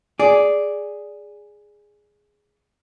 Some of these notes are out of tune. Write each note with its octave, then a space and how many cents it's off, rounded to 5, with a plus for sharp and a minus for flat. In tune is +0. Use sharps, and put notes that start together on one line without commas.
G#4 +0 D5 -5